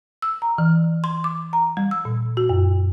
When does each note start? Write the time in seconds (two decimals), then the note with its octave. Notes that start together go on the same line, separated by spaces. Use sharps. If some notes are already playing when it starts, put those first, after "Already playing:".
0.22 E6
0.42 A#5
0.58 E3
1.04 C6
1.24 D6
1.53 A#5
1.77 G3
1.91 E6
2.05 A#2
2.37 F#4
2.49 F#2